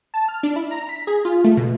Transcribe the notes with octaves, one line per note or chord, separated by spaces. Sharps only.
A5
F6
D4
E4
A#5
B6
G#4
F4
A3
B2